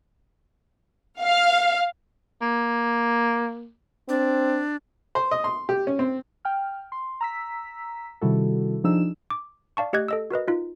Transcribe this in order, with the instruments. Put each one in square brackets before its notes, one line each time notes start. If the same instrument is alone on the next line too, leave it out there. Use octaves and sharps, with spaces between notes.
[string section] F5
[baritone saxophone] A#3
[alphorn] C4 [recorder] D4
[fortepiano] C5
D#5
C6
G4
C#4
C4
[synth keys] G5 F6
C6
A#5 E6 B6
C3 D#3 G3 E4 F#4 A4
F3 D4 D#4 G#4 E6 E7
[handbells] D6
D5 F5 A5 C#6
A3 G4 D#5 F#6 G#6
A4 D#5 E6
F#4 A#4 B4 D#5
D#4 F4